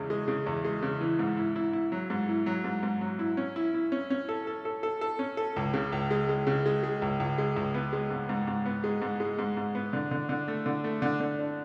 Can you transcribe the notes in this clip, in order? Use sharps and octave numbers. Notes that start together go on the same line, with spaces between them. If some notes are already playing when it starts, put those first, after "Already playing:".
Already playing: E2 C#3 G#3
G#3
C#3
E2
G#3
C#3
E3
G#2
E4
E4
E4
F#3
G#2
E4
F#3
G#2
G#2
F#3
E4
C#4
E4
E4
C#4
C#4
A4
A4
A4
A4
A4
C#4
A4
C#2
C#3
C#2
G#3
G#3
C#3
G#3
G#3
C#2
C#2
G#3
C#2
B3
G#3
G#2
G#2
G#2
B3
G#3
G#2
G#3
G#2
G#2
B3
D3
D3
D3
A3
D3
A3
D3
D3
D4